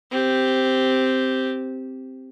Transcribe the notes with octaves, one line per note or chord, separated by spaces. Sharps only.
C4 G4